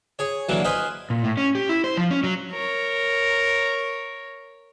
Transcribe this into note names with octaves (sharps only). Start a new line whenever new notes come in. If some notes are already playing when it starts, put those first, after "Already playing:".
G#4 C#5
D3 E3 F#3 A#3
B4 C5 D#5 F5 G#5
A#2
A2
C#4
G4
E4
C5
F3
C#4
F#3
A#4 C#5